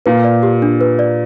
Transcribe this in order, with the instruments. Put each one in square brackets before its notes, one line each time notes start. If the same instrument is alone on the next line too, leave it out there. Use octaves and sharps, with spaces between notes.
[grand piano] A#2 [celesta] B4
[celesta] D5
G4
D4
B4
D5